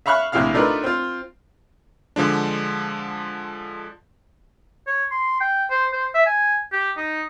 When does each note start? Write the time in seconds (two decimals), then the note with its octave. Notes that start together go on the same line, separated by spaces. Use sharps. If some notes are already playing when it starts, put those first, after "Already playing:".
0.06 E5 F5 B5 C#6 F6 F#6
0.32 A#1 A2 C3 E4 F5 F6
0.54 A3 D4 D#4 F4 A#4 B4
0.84 C4 F4
2.16 D3 F3 G#3 D4
4.87 C#5
5.11 C6
5.41 G5
5.70 C5
5.93 C5
6.14 E5
6.26 G#5
6.72 G4
6.97 D#4